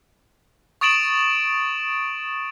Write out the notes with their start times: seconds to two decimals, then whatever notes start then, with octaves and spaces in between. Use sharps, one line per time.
0.81 C#6 D#6 A6 D7 E7 F#7